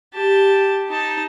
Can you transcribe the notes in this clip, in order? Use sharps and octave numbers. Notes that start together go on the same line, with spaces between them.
G4 A5
D#4 A5